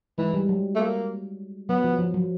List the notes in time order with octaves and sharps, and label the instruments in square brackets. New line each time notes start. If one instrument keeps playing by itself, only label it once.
[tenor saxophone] E3 [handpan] G#3
[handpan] G3
F#3
[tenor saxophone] A3
A#3
[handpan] F#3 [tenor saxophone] B3
[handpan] F3
F3
F#3